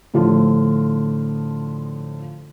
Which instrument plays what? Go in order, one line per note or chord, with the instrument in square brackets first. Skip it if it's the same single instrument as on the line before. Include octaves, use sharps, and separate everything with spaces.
[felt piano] A2 D3 F3 D4 F4